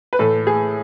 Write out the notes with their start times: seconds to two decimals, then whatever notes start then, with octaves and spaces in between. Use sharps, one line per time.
0.13 B4
0.19 A2 E3 A3 A4
0.47 G#4